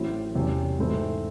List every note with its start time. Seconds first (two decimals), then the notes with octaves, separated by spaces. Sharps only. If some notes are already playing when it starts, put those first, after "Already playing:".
Already playing: A1 A2 F#3 C4 E4
0.35 E1 E2 C3 F#3 C#4
0.79 G#2 E3 A3 C4 E4